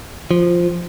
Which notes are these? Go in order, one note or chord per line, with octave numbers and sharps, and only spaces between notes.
F3